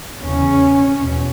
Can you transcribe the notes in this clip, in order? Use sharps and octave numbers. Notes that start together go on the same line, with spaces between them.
E2 C#3 C#4
E2 B2